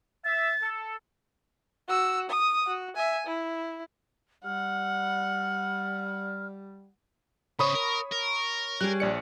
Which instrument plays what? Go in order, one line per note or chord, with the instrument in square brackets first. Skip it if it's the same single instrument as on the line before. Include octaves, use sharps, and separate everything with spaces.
[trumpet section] E5 [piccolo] A6
[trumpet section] A4
[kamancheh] F#4 E6
D#6
F#4
E5 G#5
E4
[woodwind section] G3 [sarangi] F#5 [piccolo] F6
[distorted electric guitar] C#3 C5 [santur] C#5 [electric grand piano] B5 D#6
[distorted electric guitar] A#4
A#4
[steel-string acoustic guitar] G3 G#4 [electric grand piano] F#6
[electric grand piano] A#1 D5 C#7